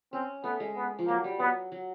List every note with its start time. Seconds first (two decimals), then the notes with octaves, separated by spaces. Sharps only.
0.13 C4 C#4
0.44 A3 B3
0.60 G#3
0.76 B3
0.99 F3
1.07 F#3 A#3
1.24 G3
1.39 F#3 B3
1.72 F#3